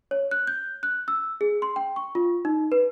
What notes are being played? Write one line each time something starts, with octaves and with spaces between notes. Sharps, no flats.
C#5
F#6
G6
F#6
E6
G#4
C6
G5
C#6
F4
D#4
B4